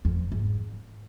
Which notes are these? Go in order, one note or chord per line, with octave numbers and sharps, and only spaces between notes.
F2
G#2